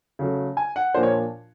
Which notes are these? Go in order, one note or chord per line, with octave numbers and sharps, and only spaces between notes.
C#3 F#3 A3
G#5
F#5
A#2 F3 A#3 D4 F4 C5
C#5